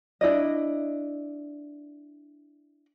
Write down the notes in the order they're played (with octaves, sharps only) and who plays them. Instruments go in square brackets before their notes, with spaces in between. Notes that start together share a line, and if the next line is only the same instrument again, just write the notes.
[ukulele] D4 E4 D5 D#5